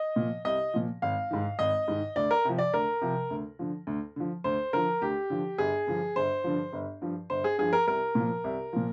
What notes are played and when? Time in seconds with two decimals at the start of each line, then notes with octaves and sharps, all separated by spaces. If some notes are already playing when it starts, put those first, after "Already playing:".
Already playing: D#5
0.16 A#2 F3
0.45 C2 D#5
0.74 A#2 F3
1.02 G#1 F5
1.31 G#2 D#3
1.59 G#1 D#5
1.88 G#2 D#3
2.16 D2 D5
2.31 A#4
2.45 C3 F3
2.58 D5
2.73 D2 A#4
3.02 C3 F3
3.30 D2
3.59 D3 F3
3.87 D2
4.16 D3 F3
4.44 D2 C5
4.73 D3 F3 A#4
5.02 D2 G4
5.30 D3 F3
5.58 G1 G#4
5.87 G2 D3 F3
6.16 G1 C5
6.44 G2 D3 F3
6.73 G1
7.01 G2 F3
7.30 G1 C5
7.44 G#4
7.58 G2 F3 G#4
7.73 A#4
7.87 C2 A#4
8.15 A#2 F3
8.44 C2
8.73 A#2 F3